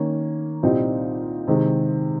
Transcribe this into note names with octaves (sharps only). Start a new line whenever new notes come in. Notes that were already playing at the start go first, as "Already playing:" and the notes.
Already playing: D#3 A#3 C#4
C2 A#2 G3 C4 D#4
C3 D#3 G#3 C4